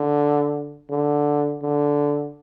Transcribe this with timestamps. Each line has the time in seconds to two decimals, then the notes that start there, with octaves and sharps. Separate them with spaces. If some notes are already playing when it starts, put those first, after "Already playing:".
Already playing: D3
0.90 D3
1.62 D3